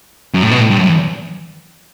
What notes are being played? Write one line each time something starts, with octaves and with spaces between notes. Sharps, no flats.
F#2
A2
B2
A2
G2
F#2
E2